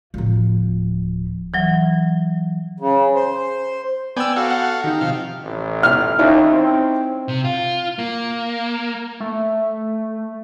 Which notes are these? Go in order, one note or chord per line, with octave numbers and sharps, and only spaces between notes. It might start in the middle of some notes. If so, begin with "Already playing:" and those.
D1 F3
E3 F#3
C#3
C5
B3 D5 G5 G#5 E6
F#4 A4 F5
F#5
D#3 D#4 G4
C3 F3 F5
A1
F6
D#2 C#4 D#4 E4
C4
C3
F4
A#3
A3